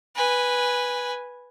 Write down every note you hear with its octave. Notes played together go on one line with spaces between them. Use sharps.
B4 G#5